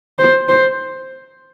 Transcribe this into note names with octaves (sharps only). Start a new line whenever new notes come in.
C5
C5